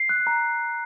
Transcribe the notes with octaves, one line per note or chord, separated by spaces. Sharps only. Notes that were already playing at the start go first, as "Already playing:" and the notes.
Already playing: C7
F#6
A#5